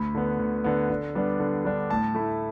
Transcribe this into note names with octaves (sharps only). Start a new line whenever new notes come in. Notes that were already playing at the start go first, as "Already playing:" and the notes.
Already playing: D2 B5
D3 B3
D2
D3 B3
D3
G3 B3 D4
D3
G3 B3 D4
A2 A5
A3 E4